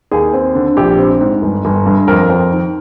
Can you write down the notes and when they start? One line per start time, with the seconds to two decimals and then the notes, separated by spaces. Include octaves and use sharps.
0.11 D#2 G#4
0.34 C4
0.55 D3
0.77 A#1 G4
0.98 C4
1.21 G#2
1.42 G1
1.65 G1
1.86 G2
2.08 F2 A#4
2.30 F2
2.52 D#3